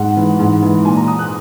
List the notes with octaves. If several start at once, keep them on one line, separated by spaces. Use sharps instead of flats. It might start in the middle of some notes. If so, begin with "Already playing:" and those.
Already playing: G#2 F#5
E3
G#2
E3
A#2 G#5
A#5
D#6
F#6